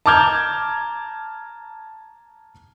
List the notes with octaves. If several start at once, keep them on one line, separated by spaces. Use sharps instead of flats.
A5 A#5 D6 F6 G6 G#6